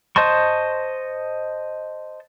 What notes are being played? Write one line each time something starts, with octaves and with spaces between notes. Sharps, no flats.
C5 D#5 A5 C6 C#6